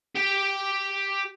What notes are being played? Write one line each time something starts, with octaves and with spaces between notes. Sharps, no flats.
G4 G5